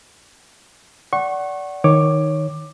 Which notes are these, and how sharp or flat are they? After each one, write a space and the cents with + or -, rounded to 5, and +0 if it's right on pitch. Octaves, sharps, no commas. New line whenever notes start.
D5 -20 F#5 +20 C#6 -25
D#3 +0 C#5 +0 D6 +15